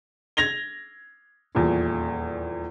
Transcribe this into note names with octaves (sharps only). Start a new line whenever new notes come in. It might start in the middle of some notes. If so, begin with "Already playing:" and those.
G#6 A#6 F7 G7
D#1 E2 A#2